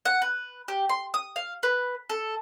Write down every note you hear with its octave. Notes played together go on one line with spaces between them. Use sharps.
F#5
B4
G4
C6
D#6
F5
B4
A4